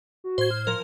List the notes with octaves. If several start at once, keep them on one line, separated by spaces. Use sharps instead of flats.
F#4
A2 C5 G#6
F6
F3 A#4